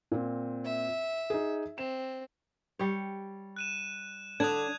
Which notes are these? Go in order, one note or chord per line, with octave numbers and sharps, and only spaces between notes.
A#2 C4
E5
D#4 G#4
C4 E7
G3 C#5
F#6 D#7 E7
D3 D4 D#6 F#6 G#6